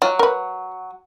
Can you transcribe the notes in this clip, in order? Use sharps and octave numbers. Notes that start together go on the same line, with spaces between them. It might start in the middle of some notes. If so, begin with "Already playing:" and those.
F#3 F4
A#4 B4